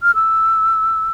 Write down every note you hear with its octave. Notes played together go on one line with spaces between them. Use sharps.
F6
E6